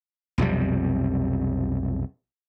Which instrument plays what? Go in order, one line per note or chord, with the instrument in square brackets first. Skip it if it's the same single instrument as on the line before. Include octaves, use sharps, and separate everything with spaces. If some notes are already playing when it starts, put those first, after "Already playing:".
[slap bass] B1 F2 C3 G3